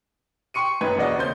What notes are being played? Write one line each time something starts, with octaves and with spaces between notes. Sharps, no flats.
G5 C6 C#6 C#7 D#7
G1 F#2 D#4 B4 G5 G#6
E2 A#3 F#4 D5 D#5
C#3 C4 C6 G6